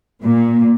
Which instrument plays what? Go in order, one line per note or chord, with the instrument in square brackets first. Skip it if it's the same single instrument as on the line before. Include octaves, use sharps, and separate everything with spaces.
[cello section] A#2